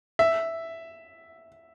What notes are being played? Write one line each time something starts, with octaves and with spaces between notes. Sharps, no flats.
E5